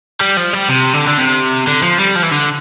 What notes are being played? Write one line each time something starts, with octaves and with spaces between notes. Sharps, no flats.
G3
F3
G3
C3
D3
D3
C3
D3
F3
G3
F3
E3
D3